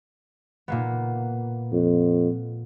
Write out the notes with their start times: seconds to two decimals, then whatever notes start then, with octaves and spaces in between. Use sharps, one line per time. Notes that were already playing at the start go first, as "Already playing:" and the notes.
0.68 A#2 A#3 B3
1.73 F2